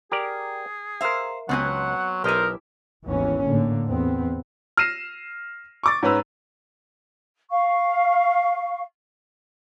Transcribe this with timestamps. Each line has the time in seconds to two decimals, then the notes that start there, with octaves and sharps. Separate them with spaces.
0.12 G4 G#4 A#4 D5
1.01 A#4 C5 E5 F5
1.49 C#2 F#3 B3 C4 B4 F#5 G#5
2.24 B1 E4 G4 A#4 C5 D#5
3.05 G#1 D#2 E3 B3 C#4
3.46 A2 D3 A#3
3.87 E2 B3 C4
4.77 F6 A#6 C7 D#7 E7
5.83 C#6 D6 A6
6.03 G#2 C#4 B4 A#5 E6
7.50 F5 C#6